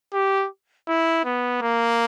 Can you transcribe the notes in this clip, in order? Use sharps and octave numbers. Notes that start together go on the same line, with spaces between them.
G4
E4
B3
A#3